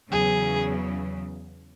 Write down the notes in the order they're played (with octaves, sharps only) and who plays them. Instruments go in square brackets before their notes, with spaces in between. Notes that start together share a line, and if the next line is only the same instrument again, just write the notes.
[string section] E2 C#3 F#3 [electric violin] G#4